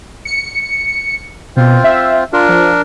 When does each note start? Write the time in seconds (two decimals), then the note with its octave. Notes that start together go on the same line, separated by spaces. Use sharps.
0.25 C#7
1.57 B2 C4 F4 C5
1.84 E5
2.33 D4 F4 A#4
2.49 F3